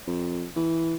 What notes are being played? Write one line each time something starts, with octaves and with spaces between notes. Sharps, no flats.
F2
E3